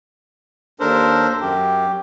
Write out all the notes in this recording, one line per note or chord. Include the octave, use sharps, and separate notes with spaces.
D#2 D4 A4 A#4 C5
F#2 G4